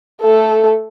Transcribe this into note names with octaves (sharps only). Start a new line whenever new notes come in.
A3 A4